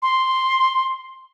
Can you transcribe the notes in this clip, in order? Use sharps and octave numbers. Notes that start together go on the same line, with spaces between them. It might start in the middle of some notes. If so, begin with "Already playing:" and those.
C6